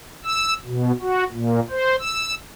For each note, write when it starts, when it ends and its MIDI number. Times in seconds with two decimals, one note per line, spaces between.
0.24 0.54 88
0.66 0.92 47
1.01 1.24 66
1.32 1.60 46
1.70 1.96 72
1.99 2.34 88